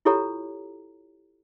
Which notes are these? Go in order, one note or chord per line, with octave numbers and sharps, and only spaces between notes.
E4 F4 G4 A4 C#5 A#5